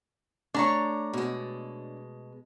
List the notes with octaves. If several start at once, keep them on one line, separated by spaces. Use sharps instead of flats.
A3 D4 C#5 A#5
B2 G#3